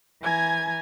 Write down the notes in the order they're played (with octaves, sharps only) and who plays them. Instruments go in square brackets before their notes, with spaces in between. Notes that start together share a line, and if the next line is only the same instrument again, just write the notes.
[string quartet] E3 G#5 A#5 G#6